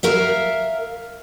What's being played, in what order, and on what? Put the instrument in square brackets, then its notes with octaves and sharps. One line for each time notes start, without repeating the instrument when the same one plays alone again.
[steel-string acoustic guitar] A#4 E5 F5